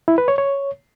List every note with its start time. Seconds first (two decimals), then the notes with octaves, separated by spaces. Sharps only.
0.08 E4
0.18 B4
0.28 C#5
0.38 C#5